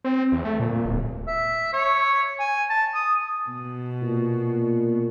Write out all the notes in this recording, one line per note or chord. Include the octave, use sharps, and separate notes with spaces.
C4
E2
A3
A#2
D1
E5
C#5
G#5
A5
D#6
B2
A#2